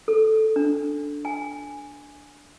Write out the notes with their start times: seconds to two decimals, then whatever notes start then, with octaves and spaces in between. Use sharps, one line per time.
0.08 A4
0.56 D4
1.25 G#5